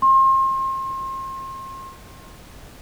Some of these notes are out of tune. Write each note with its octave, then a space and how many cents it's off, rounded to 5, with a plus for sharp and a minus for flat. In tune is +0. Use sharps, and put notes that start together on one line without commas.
C6 +35